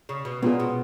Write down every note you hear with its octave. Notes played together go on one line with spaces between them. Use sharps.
C#3
B2
A#2 B3 F4 G#4
B2